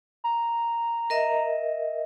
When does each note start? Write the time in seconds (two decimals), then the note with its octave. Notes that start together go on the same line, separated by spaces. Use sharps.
0.24 A#5
1.10 A#4 D#5 E5